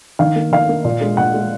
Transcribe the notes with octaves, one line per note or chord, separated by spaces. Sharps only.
D#3 F5
A#3
D#3 F5
A#3
A#2
G#3
A#2 F#5
G#3